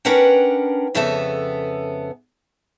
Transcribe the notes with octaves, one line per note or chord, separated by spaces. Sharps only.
C#4 D4 A#4 B4 F#5 G5
F2 C#3 B3 A4 E5